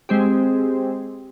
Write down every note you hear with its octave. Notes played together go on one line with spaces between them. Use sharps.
G#3 C4 G4